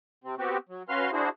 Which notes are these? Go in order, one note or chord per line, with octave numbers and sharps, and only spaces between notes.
C3 C4
B3 C4 F#4 G4
F#3
C#4 F#4 B4 F5 C6 F6
D4 E4 F#4 G#4 C5